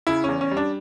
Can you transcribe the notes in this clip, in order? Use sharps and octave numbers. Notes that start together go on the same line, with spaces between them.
C#3 E4
E2 C#4
C#4
G3
D4